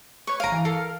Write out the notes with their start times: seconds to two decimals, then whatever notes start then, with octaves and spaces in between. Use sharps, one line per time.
0.27 B4 C#5 C#6
0.40 G1 F5 A#5 D7 D#7
0.52 E3
0.65 A4 A#4 F5 A#5